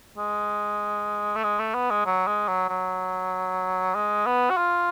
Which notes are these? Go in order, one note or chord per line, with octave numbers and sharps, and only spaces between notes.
G#3
A3
G#3
A3
B3
G#3
F#3
G#3
F#3
F#3
G#3
B3
F#4
F4